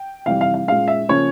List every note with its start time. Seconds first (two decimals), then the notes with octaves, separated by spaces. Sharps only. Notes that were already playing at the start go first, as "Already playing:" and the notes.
Already playing: G5
0.26 F2 C3 E3 G3 F5
0.41 F5
0.54 F5
0.68 A#2 G#3 C#4 F5
0.88 E5
1.08 C#3 F3 A#3 C#4 C#5